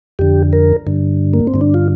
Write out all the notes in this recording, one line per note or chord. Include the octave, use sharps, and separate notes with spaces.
F2 D3 G4
A#4
G2 D3
A#3
C4
G2 D3
D4
F4